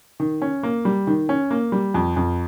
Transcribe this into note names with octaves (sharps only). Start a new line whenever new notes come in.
D#3
C#4
A#3
G3
D#3
C#4
A#3
G3
F2
F2